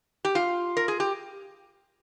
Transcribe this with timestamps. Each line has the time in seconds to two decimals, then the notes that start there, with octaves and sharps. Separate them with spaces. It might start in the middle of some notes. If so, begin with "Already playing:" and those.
0.25 G4
0.35 F4
0.77 A#4
0.88 G#4
1.00 G4